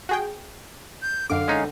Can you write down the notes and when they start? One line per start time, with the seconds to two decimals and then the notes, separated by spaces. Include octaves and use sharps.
0.09 F#4 G#4 G5
1.02 G6
1.30 F#2 D3 F5 D6
1.48 G#3 C#4 D#4